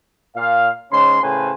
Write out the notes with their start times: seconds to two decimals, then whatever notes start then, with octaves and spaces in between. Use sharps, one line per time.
0.36 A#2 F5
0.91 G#2 C#3 C#4 C#5 C6
1.22 A2 C#3 B4 C5 G#5